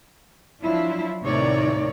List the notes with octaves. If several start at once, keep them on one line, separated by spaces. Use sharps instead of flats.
F3 F#3 D4 E4 F4
D#2 A2 C3 D#4 C#5 D5